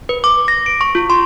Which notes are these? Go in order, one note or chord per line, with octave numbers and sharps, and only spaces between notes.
B4
D6
A#6
D7
C#6
F4
C6